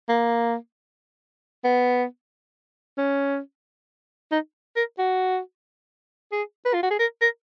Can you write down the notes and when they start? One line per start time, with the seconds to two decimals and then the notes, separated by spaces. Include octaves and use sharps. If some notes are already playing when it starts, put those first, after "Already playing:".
0.09 A#3
1.64 B3
2.98 C#4
4.32 D#4
4.76 A#4
4.99 F#4
6.32 G#4
6.65 B4
6.74 F4
6.83 F#4
6.91 G#4
6.99 A#4
7.21 A#4